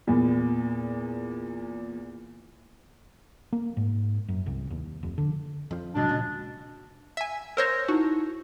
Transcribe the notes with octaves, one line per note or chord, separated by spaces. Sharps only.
E2 A#2
A#3
G#2
F#2
C2
D#2
F1
D3
F2 F3
G#2 B2 D3 F#3 G#3 D4
D#2 A#2 C#3
E5 G#5
A#4 C5 C#5 E6 A#6
D#4 E4 F#4